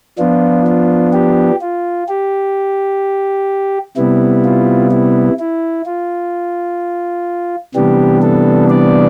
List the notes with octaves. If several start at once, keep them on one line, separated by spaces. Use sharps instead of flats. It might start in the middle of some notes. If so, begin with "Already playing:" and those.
F3 B3 D4 F4
F4
G4
F4
G4
C3 G3 B3 E4
F4
E4
E4
F4
C3 E3 G3 B3 D4 G4
A4
D5